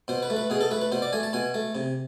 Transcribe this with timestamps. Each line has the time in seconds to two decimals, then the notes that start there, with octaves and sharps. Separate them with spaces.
0.08 B2 C5
0.23 B4
0.30 A3
0.37 B4
0.50 B2 G#4
0.61 A4
0.71 A3 B4
0.81 B4
0.92 B2 C5
1.02 D5
1.13 A3 G#5
1.23 A5
1.33 B2 G#5
1.54 A3
1.75 C3